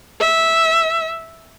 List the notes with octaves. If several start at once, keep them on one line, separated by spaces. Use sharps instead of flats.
E5